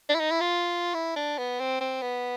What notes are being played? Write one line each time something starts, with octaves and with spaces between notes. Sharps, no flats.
D4
E4
D#4
E4
F4
E4
D4
B3
C4
C4
B3